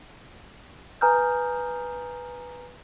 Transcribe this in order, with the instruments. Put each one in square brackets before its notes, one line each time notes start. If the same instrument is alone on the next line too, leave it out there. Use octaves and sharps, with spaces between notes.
[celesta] B4 G#5 A#5 D#6 F6 G6